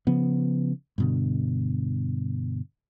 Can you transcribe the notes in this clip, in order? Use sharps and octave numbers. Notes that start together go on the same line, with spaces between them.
C#3 F3 B3
G2 B2 D3